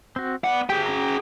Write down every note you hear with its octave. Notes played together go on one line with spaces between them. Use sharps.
C4 F#4
B3 D5 F#5
G4 G#4 G5
C#4 A#5